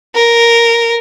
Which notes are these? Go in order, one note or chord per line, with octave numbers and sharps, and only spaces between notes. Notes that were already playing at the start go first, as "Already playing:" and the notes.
A#4